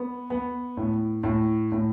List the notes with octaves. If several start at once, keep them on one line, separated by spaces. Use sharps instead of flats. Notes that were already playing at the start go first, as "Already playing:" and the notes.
Already playing: B3
B3
A2
A2
A2